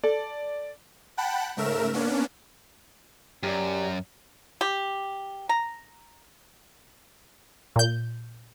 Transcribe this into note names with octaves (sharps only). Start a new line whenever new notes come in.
A4 D5
F#5 G5 A5 B5 F#6
G#2 C#3 A3 A#4 E5 E7
A#3 B3 C#4 D4
F#2 G4 D5
G4
A#5
A#2 G6